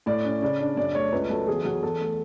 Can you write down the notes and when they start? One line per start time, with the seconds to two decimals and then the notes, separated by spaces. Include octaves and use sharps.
0.06 A2 D5
0.25 C#4
0.42 C#3 D5
0.59 D4 D5
0.77 F#2 D5
0.95 A3 C#5
1.12 C#2 B4
1.30 F#3 A4
1.47 E2 G#4
1.65 F#3
1.82 E2 A4
2.01 A3